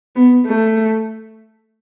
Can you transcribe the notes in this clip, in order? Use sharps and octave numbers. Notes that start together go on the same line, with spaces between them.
B3
A3